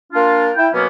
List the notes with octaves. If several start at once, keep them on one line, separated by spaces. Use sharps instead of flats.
A#3 D4 F4
E4 G5
B2 F#3 A#3 B3 C#4